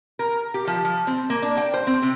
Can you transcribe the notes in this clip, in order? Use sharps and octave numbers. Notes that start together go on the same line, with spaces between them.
A#4
G4
F3
F3
C4
A#3
D4
G5
C5
C4
C3